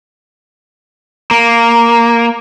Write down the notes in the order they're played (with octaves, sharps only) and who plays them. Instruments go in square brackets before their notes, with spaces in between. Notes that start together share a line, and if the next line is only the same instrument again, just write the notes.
[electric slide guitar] A#3